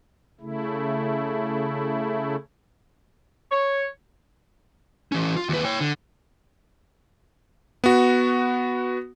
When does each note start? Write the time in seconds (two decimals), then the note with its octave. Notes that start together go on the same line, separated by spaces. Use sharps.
0.41 C#3 A3 E4
3.50 C#5
5.12 E3 C#4
5.37 F4
5.49 D#2 B4
5.65 C#5 G5
5.81 D3
7.84 B3 F#4